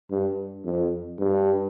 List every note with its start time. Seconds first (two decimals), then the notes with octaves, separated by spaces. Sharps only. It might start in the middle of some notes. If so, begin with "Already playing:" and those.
0.11 G2
0.65 F2
1.19 G2